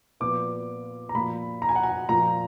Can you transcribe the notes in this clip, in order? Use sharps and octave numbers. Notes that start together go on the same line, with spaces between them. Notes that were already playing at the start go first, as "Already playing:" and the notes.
A#2 F3 B3 D6
A#5
A#2 F3 A#3 B5
A#5
G#5
F#5
G#5
A#2 F3 A#3 A#5